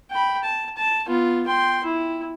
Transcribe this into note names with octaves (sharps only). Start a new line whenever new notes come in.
G5 B5
A5
A5
B3 F4
G5 C6
E4